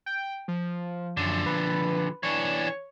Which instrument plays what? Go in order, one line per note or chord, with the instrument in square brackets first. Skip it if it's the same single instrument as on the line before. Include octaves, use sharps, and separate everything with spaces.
[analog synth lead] G5
F3
[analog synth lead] F#2 [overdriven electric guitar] D3 F3
[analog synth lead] B4
[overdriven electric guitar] E3 D4 [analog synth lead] C#5